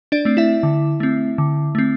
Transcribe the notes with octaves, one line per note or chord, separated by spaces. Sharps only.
D4 D5
A3 C4
E4 E5
D3
A3 C4
D3
A3 C4